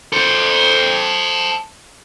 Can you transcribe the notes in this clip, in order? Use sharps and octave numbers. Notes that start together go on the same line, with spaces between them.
A4 C5